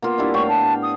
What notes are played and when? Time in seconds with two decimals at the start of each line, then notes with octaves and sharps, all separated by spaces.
0.02 A#3 B3 F4
0.18 G3 D4 E4
0.34 A2 F5 G5 C#6
0.48 A5
0.82 D#6